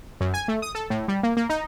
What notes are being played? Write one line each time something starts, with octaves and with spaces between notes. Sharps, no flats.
F#2
G#5
A3
D#6
A4
A2
G3
A#3
A#3
D#4